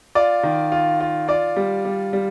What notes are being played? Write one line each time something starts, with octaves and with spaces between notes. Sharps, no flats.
F4 D5
D#3
F4
F4
F4 D5
G3
G3
G3